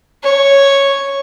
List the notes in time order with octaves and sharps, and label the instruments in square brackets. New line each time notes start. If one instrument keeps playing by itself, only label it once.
[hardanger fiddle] C#5